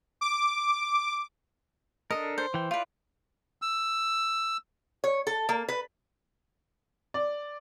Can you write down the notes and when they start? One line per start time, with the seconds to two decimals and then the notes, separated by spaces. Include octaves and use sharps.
0.21 D6
2.11 D4 A4 A#4 D#5
2.38 C5
2.54 E3 G5
2.71 E4 F4 B4 D5
3.62 E6
5.04 C#5
5.27 A4
5.49 A#3
5.69 B4
7.14 D5